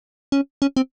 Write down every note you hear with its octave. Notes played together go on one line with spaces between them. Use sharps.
C#4
C#4
C4